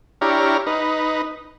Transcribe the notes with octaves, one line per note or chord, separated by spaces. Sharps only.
D4 E4 G4 C#5 A#5 F6
D#4 B4